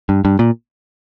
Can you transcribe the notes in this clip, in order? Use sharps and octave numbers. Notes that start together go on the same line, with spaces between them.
G2
G2
A#2